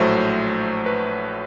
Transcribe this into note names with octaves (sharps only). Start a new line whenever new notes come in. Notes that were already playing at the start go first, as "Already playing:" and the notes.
Already playing: A#1 A2 F#3 A3 C5
B4